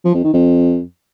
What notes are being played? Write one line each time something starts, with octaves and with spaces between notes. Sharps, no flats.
F3
F2
D#3
F2